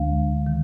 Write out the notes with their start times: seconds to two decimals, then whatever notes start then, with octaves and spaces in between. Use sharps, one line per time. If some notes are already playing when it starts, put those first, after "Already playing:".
Already playing: D2 D3 G#3 D4 F5
0.47 D#3